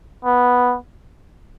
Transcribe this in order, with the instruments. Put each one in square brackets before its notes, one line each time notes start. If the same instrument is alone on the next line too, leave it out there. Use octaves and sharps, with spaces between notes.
[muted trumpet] B3